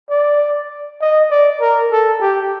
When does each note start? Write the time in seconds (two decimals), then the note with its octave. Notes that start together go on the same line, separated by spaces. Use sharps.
0.10 D5
1.01 D#5
1.30 D5
1.61 A#4
1.92 A4
2.21 G4